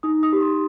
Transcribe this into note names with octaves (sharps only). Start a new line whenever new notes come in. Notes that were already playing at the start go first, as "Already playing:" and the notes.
D#4 D#6
D#6
G4
C6